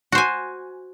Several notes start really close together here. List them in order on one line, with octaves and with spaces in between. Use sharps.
F#4 C5 G#5